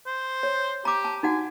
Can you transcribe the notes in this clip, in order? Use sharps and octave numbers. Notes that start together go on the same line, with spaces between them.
C5
C#5
G4 A#5 D6
A5
D#4 F#4 F#5 G#5